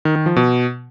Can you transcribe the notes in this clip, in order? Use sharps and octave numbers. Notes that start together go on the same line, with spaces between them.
D#3
D#3
F3
B2